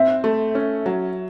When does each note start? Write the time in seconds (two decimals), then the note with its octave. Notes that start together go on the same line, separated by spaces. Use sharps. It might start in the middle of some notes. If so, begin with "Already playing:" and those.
Already playing: C4 E5
0.24 A3
0.55 C#4
0.86 F#3